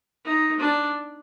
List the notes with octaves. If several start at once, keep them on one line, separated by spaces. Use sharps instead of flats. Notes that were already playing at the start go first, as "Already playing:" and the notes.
D#4
D4